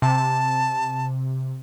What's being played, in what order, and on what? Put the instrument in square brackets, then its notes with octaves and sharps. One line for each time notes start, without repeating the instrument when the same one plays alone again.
[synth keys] C3 [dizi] A5